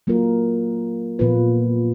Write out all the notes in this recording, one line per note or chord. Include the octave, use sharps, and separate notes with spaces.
F#3 A#3 F4 A#4
A#2 F3 B3 F4 B4